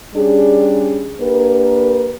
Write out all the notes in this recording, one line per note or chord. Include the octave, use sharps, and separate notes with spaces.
G3 C#4 D4 G#4
A#3 D4 G4 A#4 B4